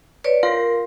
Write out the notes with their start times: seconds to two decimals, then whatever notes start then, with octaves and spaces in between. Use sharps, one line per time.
0.24 B4 C#5 D5
0.43 F4 A#4 F5